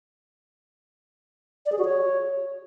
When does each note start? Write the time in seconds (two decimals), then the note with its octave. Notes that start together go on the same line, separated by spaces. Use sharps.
1.66 D5
1.72 G#4
1.78 F#4
1.85 C#5